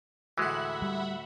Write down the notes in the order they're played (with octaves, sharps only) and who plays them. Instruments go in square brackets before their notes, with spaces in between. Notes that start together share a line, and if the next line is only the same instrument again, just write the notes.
[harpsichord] D2 A2 [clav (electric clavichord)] E3 G#3 [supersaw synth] E5 F#5 B5
[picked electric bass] G3